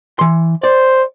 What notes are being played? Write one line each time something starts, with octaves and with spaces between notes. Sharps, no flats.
E3 C6
C5 D5